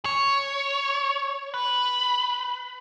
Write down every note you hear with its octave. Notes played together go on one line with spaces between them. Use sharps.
C#5
B4